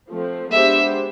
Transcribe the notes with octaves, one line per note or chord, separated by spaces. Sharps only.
F3 A3 C4
G#3 B3 D4 G4 C5 E5